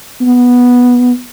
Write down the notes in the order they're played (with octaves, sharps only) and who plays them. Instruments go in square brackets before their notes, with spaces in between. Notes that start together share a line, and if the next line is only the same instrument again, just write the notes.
[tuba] B3